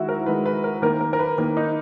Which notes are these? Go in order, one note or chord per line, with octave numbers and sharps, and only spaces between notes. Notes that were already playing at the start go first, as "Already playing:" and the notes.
Already playing: D#3 G#3 E4 F#4
A#4
D#3 G#3 B4
B4
A#4
D#3 A#3 A#4
A#4
A#4
B4
D#3 A#3 A#4
D#4